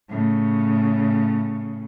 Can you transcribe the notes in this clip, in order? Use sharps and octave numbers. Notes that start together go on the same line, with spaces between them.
A2 C#3